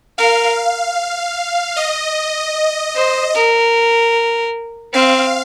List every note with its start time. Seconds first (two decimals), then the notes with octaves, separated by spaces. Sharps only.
0.18 A#4 F5
1.76 D#5
2.96 C5
3.35 A#4
4.93 C4 F5